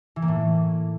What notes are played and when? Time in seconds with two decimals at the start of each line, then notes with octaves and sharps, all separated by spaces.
0.16 E3
0.22 A#3
0.28 A2